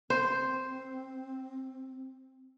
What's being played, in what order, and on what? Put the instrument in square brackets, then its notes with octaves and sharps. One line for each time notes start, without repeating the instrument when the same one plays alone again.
[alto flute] C4 [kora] C5